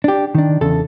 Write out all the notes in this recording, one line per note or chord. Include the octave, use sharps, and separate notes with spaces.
D4 G4
D#3 D4
E2 C#3 A4